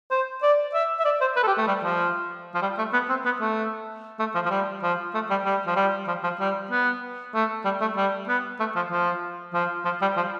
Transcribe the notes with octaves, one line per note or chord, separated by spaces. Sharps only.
C5
D5
E5
E5
D5
C5
B4
A4
G4
A3
G3
F3
F3
G3
A3
B3
C4
B3
A3
A3
F3
F3
G3
F3
A3
G3
G3
F3
G3
F3
F3
G3
B3
A3
G3
A3
G3
B3
A3
F3
F3
F3
F3
G3
F3